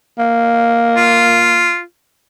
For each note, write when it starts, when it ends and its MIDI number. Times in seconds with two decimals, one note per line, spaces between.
0.18 1.74 58
0.97 1.82 65